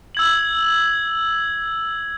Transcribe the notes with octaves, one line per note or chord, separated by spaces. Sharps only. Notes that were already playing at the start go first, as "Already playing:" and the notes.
E6 G#6 F#7